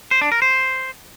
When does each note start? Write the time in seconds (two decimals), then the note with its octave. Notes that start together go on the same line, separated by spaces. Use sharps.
0.11 C5
0.21 D4
0.32 A#4
0.42 C5